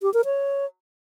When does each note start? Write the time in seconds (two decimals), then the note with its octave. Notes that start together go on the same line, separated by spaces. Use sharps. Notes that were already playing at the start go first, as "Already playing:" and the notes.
0.02 G4
0.14 A#4
0.25 C#5